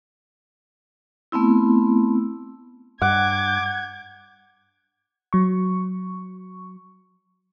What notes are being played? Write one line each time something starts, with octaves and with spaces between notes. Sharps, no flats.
A3 B3 C4 E4
G2 F#5 D6 G#6
F#3 C#6